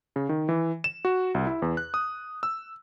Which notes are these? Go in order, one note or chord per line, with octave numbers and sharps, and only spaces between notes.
C#3
D#3
E3
E7
F#4
C2
E4
E2
F#6
D#6
E6